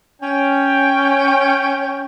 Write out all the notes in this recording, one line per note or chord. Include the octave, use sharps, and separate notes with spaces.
C#4 G5